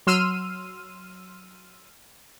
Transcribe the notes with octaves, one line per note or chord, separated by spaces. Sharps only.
F#3 C6 E6 F6 D#7